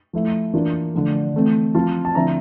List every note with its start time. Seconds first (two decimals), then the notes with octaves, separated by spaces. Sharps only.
0.13 F3 A3 E4
0.54 E3 A#3 D4 F4
0.94 D3 F3 A3
1.34 E3 A3 C4
1.75 F3 C4 F4 A5
2.05 A5
2.15 D3 F3 C4 E4 A#5